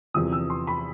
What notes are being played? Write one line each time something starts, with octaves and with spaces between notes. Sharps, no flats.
E2 C3 F3 D#6
E6
C6
B5